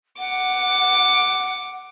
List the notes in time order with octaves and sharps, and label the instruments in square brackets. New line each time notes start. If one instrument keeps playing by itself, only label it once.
[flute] F#5 [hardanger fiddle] D6